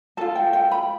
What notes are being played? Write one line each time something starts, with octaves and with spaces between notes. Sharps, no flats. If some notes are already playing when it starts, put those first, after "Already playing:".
F4 A4 A5
G5
G5
B5